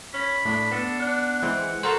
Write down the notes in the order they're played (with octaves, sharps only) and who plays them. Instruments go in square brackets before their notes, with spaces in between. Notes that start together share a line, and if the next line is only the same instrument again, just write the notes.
[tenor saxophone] C#4 [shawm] B5
[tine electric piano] A2 [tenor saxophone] D4
[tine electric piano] B3 [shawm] A4
[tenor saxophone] D4 [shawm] F#5
[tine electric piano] E3 G#3 [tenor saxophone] C4
[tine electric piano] F#4 A#4 C5 [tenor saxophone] A4